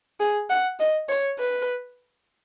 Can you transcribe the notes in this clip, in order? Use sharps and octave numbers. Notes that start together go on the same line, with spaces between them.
G#4
F#5
D#5
C#5
B4